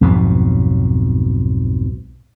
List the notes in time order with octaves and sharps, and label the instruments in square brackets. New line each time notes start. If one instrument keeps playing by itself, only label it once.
[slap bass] B1 F2 G#2 B2